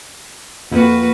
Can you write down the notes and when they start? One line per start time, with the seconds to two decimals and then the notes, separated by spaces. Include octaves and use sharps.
0.71 F2 A#3 F#4 B4